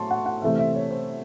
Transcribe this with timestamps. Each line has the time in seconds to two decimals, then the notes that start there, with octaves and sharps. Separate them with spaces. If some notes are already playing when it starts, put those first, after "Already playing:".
Already playing: A2 F#3 A3 A5 C6 C#6
0.11 F#5
0.26 F#5
0.42 C3 E3 A3 C4 E5
0.59 E5
0.75 C#5
0.91 C5